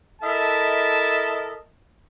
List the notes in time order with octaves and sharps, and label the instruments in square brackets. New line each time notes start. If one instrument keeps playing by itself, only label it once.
[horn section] E4 A4 A#4 D#5 E5 A5